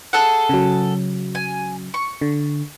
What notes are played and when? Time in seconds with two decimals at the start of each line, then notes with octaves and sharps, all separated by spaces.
0.13 G#4 A4 F#5
0.49 C#3 F#3
1.35 G#5
1.94 C#6
2.21 D3